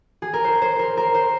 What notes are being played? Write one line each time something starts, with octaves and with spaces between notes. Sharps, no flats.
G#4
A#4
C5
C5
A#4
A#4
C5